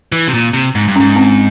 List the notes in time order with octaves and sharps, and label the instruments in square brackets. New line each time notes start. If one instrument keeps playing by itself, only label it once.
[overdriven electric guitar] E3
C3
A#2
C3
G#2
G2
[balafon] C#4
[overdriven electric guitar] G#2
[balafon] C4